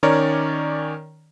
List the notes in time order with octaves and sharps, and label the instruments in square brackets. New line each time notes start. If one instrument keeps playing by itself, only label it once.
[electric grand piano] D#3 C#4 A#4 C#5 D5